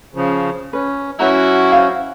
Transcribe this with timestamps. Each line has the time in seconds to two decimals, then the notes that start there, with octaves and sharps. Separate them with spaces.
0.14 C#3 F3
0.73 C#4 B4
1.20 F#3 C#4 E4 F#4 B4 E5 A#5
1.72 C5 F5